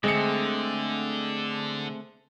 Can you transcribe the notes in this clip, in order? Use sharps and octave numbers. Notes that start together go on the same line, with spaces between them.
D3 G#3 A3 C4 D#5 C#7